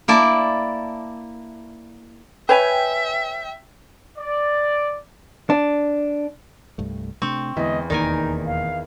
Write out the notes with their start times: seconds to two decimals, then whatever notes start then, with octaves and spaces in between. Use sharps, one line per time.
0.08 A#3 E4 D5 A5
2.49 B4 C#5 E5 G5 G#5
4.18 D5
5.50 D4
6.78 C2 G2 A3
7.22 C3 A3 C4 D4 C#6
7.56 E2 D3 G#3 B3 D#5
7.90 E1 D#2 D#3 A#3 D#4 A#4 D5 G#5
8.46 F5